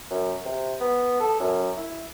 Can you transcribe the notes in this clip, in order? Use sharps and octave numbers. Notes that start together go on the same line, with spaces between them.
F#2
C3
B3
A4
F#2
E4